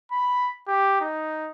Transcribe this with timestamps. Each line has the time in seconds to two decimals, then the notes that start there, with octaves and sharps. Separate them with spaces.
0.12 B5
0.68 G4
1.01 D#4